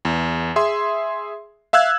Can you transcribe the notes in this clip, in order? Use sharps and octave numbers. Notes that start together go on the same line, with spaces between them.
E2
G#4 E5 C6
E5 F5 E6 F#6 G#6